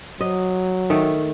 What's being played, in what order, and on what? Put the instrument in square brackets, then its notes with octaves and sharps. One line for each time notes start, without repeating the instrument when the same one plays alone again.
[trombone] F#3 [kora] D#5
[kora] D#3 A3